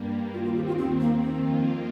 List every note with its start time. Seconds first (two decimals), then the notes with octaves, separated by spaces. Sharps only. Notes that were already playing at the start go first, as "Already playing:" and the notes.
Already playing: G2 G3 A#3
0.33 D#2 D#3 C4 F4
0.45 F4
0.56 G4
0.67 F4
0.78 C4
1.00 A#3
1.22 F2 D#3 A#3 C4 F4